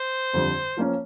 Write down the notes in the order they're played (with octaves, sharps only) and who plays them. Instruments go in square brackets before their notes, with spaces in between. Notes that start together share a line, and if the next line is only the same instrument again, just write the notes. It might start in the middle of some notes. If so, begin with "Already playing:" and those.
Already playing: [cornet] C5
[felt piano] F2 D3 G3 C4
F3 A#3 C#4